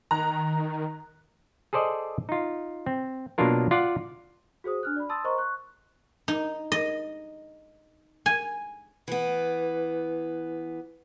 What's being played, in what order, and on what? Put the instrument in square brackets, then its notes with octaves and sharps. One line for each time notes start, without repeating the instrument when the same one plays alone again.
[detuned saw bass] D#3 [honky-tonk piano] A#5 F#6
[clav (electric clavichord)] G#4 A4 C5 D5 D#5
D#4 F4
C4
B2 F#3 A#3 D4 F4 A#4
F4 D5 F#5
[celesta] F#4 G#4 C5 D#6
D4 F6 F#6
D5 B5
A5 C6 D#6 E6 A6
A#4 C5 D#5 A#5 C6 C#6
C#6 F#6
[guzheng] D#4
D#5
G#5
[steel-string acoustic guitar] E3 B3